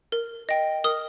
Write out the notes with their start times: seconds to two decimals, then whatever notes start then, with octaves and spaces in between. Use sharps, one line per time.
0.12 A#4
0.49 D#5 G5
0.84 A#4 D#6